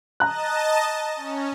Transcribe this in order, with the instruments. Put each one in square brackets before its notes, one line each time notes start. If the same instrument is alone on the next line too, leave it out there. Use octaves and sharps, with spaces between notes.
[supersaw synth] D#5 A5 [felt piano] A#5 F#6
[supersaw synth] C#4